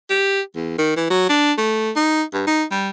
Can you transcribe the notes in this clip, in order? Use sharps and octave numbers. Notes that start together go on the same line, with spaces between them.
G4
E2
D#3
E3
F#3
D4
A3
D#4
G2
D#4
G3